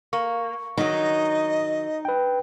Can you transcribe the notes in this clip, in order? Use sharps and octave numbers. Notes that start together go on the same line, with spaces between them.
A#3 C#6
D#3 F#3 D#4 D#5
B4 G5